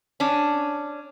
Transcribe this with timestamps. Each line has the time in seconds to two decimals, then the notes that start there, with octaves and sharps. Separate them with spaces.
0.20 C#4 D4